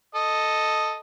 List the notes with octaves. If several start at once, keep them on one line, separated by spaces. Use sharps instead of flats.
A4 D#5